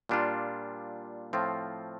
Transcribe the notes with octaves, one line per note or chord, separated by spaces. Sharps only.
A#2 G3 D4 F4
A2 F3 C4 F4